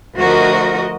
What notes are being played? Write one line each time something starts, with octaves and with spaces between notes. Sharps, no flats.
D2 F3 F#4 A#4 D#5